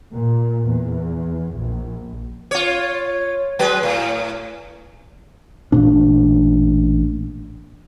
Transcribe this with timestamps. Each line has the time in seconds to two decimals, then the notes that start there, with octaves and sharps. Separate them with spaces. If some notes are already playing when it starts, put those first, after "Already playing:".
0.12 A#2
0.67 E2
1.53 A#1
2.51 F4 C#5
3.59 F#3 G#3 B4
3.83 A2
5.72 A1 A#2 D4